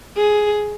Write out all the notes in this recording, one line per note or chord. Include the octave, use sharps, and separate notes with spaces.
G#4